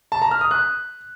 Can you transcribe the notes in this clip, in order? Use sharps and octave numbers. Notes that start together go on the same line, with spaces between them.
A5
A#5
F6
D#6
F#6